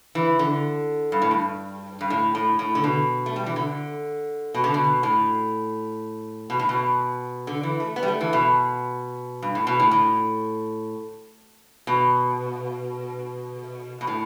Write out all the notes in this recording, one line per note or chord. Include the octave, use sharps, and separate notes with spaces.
E3
D3
G2
A2
G2
G2
A2
A2
A2
D3
B2
A3
G3
E3
D3
B2
D3
B2
A2
B2
A2
B2
D3
E3
A3
B3
G3
A3
E3
B2
G2
A2
B2
A2
A2
B2
B2
A2